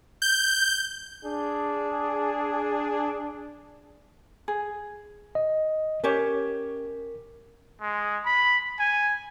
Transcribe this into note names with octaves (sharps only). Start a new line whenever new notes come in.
G6
D4 G#4
G#4
D#5
C#4 G4 A#4 C#5
G#3
B5
G#5